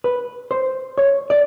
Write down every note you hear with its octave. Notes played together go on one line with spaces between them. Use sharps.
B4
C5
C#5
D5